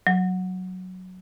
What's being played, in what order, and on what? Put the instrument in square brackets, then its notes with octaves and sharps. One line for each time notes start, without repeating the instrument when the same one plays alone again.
[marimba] F#3